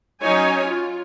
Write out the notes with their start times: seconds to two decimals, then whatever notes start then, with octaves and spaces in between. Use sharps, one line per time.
0.22 F#3 C#4 D#4 C#5 G#5
0.67 F4